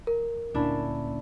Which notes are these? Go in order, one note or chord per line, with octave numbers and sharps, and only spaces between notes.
A#4
D2 A#2 A#3 C#4 D4 E4